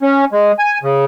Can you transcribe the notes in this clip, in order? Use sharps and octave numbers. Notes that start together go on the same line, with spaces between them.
C#4
G#3
G#5
C#3